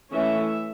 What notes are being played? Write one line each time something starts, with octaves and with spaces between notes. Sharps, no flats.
E3 A3 C#4 E5